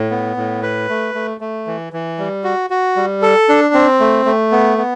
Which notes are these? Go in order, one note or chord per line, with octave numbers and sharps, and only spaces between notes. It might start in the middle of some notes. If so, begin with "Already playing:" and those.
Already playing: A2
B3
A2
B4
A3
A3
A3
E3
E3
G3
F#4
F#4
G3
A4
D4
C4
A3
A3
B3
B3